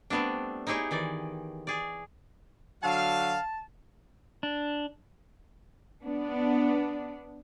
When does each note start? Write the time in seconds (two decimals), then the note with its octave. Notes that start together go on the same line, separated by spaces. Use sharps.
0.10 G3 A3 B3 C4 D4
0.67 D#4 E4 G4 G#4 C#5
0.91 D#3 E3 D5
1.67 G#4 D5
2.83 D3 F#3 F5 A5
4.43 D4
6.03 B3 D4